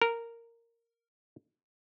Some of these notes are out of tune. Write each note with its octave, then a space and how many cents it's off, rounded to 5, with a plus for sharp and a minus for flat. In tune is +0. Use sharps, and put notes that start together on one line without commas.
A#4 -10